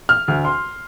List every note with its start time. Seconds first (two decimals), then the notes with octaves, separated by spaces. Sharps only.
0.09 F6
0.28 D2
0.45 C6